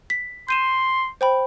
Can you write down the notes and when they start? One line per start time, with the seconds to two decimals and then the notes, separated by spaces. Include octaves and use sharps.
0.10 B6
0.49 C6 G6 D#7 E7
1.21 C5 G5 B5